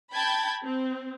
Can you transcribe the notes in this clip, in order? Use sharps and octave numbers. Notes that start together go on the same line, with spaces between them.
G5 A5 B5 G6 G#6
C4